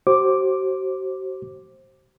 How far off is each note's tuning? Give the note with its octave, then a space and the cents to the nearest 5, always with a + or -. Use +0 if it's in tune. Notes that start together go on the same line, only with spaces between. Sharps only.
F#4 +45 C5 +25 D6 +0